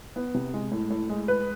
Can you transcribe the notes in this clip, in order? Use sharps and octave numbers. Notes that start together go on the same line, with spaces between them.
B3
C3
G#3
A2
A2
G#3
B4